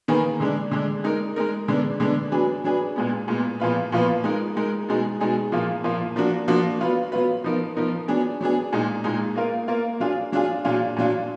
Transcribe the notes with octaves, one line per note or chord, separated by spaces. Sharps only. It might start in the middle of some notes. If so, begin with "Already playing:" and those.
D#3 A#3 D#4 G#4 B4
D3 G#3 D4
D3 G#3 D4
G#3 D#4 A#4
G#3 D#4 A#4
D3 G#3 B3 D4
D3 G#3 B3 D4
F#3 D4 G#4 B4
F#3 D4 G#4 B4
A#2 G#3 B3
A#2 G#3 B3
A#2 F3 B3 F4 B4
A#2 F3 B3 F4 B4
G#3 D#4 A#4
G#3 D#4 A#4
B2 G#3 D#4 G#4
B2 G#3 D#4 G#4
A#2 F3 A#3 F4
A#2 F3 A#3 F4
F3 A#3 D4 F#4
F3 A#3 D4 F#4
F#3 B3 F4 B4
F#3 B3 F4 B4
F3 B3 D#4 A#4
F3 B3 D#4 A#4
F#3 B3 D4 G#4
F#3 B3 D4 G#4
A#2 G#3 D#4
A#2 G#3 D#4
A#3 F4 A#4
A#3 F4 A#4
F#3 D4 F4 G#4
F#3 D4 F4 G#4
A#2 F#3 D4 F4
A#2 F#3 D4 F4